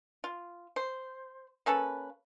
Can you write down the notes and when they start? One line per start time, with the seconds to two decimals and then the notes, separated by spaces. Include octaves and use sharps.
0.24 F4
0.76 C5
1.66 A#3 C#4 A4 B4